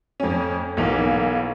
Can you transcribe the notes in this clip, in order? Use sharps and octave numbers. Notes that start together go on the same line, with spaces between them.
F2 C#4
B1 E3 A#3